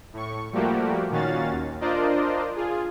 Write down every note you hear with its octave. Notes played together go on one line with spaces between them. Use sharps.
A2 C#6
F3 G3 A3 A#3 F#4 G4
A#2 D#3 C#4 F#4 F5 A6
D#2
D4 F4 A#4 C5 D5 D#5
F4 G#4